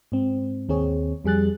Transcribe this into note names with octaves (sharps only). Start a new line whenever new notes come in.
G#2 C4
D#2 C4 G#4 C#5
F2 G3 G#4 F#6 A6